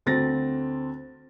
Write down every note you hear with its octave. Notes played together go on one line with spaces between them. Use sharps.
D2 C4 A6 A#6